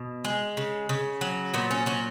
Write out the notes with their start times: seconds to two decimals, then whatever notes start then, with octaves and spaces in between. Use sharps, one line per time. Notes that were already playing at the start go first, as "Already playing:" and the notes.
Already playing: B2
0.25 G#3
0.57 C#3
0.89 C#3
1.21 F#3
1.54 A#2 B3
1.71 C#4
1.86 F#3 C#4